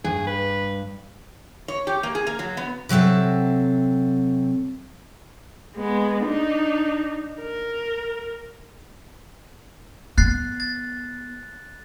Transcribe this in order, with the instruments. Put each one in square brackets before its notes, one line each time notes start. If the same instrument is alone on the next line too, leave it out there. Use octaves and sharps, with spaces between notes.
[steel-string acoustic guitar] G2 [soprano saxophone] G#4
[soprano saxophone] B4
[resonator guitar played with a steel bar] C#5
G4
A#3
G#4
A#3
F#3
B3
[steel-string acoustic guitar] C3 F#3 C4 A4 E5
[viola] G#3 B3
D4 D#4
A#4
[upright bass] B3 [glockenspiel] F#6 A6 C7
[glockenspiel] A6